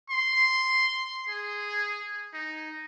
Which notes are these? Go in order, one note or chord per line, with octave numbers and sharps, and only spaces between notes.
C6
G#4
D#4